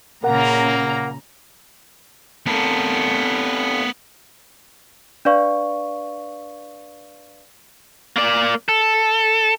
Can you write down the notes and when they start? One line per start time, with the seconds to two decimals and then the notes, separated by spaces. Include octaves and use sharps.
0.24 A#2 C#3 A#3 A#4 F#5 A#5
2.47 C3 B3 A4 A#4
5.25 D4 B4 D5 F5 C#6
8.16 A#3 D5
8.69 A4